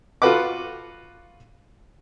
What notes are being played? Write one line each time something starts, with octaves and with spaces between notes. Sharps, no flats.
F4 F#4 A4 B4 F#5 D6